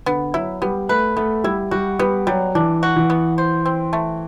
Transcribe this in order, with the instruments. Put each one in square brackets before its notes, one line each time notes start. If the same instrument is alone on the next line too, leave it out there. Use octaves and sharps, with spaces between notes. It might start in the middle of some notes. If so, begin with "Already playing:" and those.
[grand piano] D3 [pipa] B3
[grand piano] F#3 [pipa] E4
[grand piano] G3 [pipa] B3
[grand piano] A3 [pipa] B4
[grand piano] A3 [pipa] B3
[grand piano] G3 [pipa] E4
[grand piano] G3 [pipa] F#4
[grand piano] G3 [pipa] B3
[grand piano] F#3 [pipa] G3
[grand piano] E3 [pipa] D4
[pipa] F#4
[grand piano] E3
[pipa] B3
C5
C4
A3